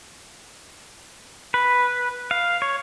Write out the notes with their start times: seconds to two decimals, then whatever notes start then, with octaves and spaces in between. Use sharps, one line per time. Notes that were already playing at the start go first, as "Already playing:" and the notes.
1.54 B4
2.31 F5
2.62 C#5